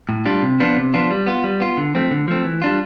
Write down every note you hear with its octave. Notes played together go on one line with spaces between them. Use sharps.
A2
G3 D4 F4
C3
F3 B3 D4 F4
C3
F3 B3 D4 F4
G3
B3 F4
G3
B3 F4
D3
F3 A3 C4
D3
F3 A3 C4
E3
G3 D4 F4